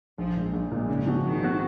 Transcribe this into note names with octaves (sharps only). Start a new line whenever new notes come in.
A#1 F3
A#2 G#3
A#1
A#2 G#3
G#2 C#3
F3 C4 F#4
G#2 D#3
F3 C4 F#4